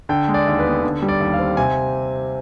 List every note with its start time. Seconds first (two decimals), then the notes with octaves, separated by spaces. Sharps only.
0.09 D3 G5
0.28 G#3
0.34 D5
0.47 D#2
0.59 B4
0.65 B3
0.83 D3
1.02 G3
1.08 D5
1.20 D#2
1.33 F5
1.39 C4
1.57 C3 G#5